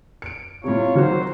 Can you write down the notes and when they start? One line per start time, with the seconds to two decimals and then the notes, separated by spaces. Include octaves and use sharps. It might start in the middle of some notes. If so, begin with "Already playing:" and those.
0.22 C#7 D7
0.64 A2 C3 F4 C#5
0.95 D#3 F#3 F#4 C5